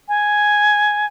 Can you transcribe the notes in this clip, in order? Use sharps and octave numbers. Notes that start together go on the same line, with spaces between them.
G#5